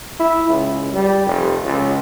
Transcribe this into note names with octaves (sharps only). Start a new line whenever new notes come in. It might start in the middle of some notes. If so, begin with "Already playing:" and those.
E4
C#2
G3
F1
C#2